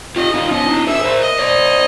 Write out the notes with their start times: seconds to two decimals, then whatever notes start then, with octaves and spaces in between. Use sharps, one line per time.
0.16 F4 G4 D#5
0.33 D#4 F4
0.51 C#4 D#4 D#5
0.69 D4 E4
0.86 G#4 A#4 E5
1.04 A#4 C5
1.22 D#5
1.39 C5 D5